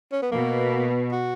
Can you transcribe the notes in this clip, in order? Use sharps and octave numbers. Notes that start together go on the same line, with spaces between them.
C#4
B3
B2 A#3
F#4